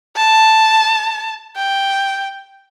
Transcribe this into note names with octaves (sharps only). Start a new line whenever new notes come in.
A5
G5